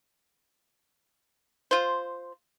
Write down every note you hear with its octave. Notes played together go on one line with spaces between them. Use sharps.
F4 C5